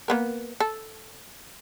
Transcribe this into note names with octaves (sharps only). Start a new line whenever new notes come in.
A#3 B3 A#4
A4